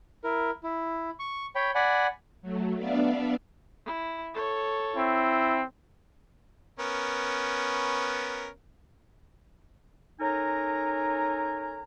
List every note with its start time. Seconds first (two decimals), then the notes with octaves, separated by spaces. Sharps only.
0.24 E4 A#4
0.63 E4
1.20 C#6
1.55 C#5 G5 B5
1.75 D5 F#5 G#5 B5
2.42 F#3 A3
2.77 B3 D4 D5 E5 F5
3.85 E4
4.34 A4 C#5
4.96 C4 E4
6.79 B3 C#4 A#4
10.20 C#4 D#4 A4 A#4 G#5 A#5